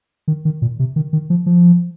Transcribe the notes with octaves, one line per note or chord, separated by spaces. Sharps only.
D#3
D#3
A#2
C3
D#3
D#3
F3
F3